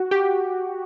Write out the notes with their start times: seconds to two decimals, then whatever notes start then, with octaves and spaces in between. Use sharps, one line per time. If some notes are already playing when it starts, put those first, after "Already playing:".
Already playing: F#4
0.11 G4